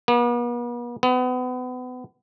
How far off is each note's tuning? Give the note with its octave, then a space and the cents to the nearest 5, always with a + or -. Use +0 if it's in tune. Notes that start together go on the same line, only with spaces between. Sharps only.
B3 -45
B3 +30